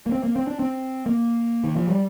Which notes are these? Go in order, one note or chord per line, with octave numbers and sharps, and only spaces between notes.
A#3
C4
A#3
C4
D4
C4
A#3
D#3
F3
G3